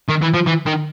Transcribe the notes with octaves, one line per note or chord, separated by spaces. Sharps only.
D#3
E3
F3
E3
D#3